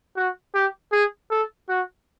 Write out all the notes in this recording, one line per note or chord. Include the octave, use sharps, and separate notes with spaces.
F#4
G4
G#4
A4
F#4